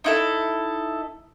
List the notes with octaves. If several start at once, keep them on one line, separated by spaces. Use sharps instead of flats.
D#4 E4 A4